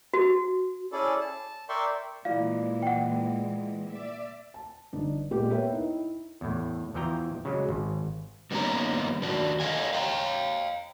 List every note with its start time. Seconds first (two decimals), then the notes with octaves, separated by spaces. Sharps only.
0.14 F#4
0.92 C#4 E4 G#4 A4 D5
1.20 A5
1.69 A#4 D5 E5 G5 C6 C#6
2.25 A#2 E3 G#3 E4 F4 D5 F5
2.83 F#5 G5
3.91 D5 E5
4.54 A5
4.93 G1 D4 D#4
5.31 A#2 G#3 A#3 B3 G4
5.50 A#3 B3 B4 C#5 E5 G5
5.72 D#4 E4
6.41 E2 A2
6.94 E2 E3 F3 G5 A#5
7.45 C#3 F#3 G#3
7.69 G#1
8.51 G2 D#3 A#3 B3 C#4 A#5
9.22 D#3 D4 F#4
9.60 A4 D#5 F5 F#5 G#5
9.93 F5 G5 A5 A#5